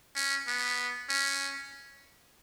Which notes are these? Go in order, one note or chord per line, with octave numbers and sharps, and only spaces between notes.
C#4
B3
C#4